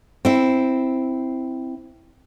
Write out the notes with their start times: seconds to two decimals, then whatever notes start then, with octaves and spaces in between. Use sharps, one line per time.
0.25 C4 E4